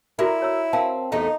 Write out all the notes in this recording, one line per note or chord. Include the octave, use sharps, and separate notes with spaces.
E4 F#4 A4 A#4 D5
C#5 A#5 E6
C4 A#4 F5 A5
E2 A3 D#4 A4 D#5 E5